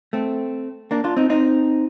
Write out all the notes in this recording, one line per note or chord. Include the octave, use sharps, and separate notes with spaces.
A3 C4
A#3 D4
D4 F4
C4 D#4
C4 D#4